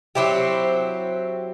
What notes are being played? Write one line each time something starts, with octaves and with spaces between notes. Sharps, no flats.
F#3 C4 E4 G4